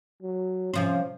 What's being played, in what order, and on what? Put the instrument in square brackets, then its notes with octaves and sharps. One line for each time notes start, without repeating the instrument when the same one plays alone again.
[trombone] F#3
[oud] C3 F3 C5 [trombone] C#4